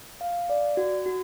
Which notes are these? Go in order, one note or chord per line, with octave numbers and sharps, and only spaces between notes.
F5
D5
F#4
F#4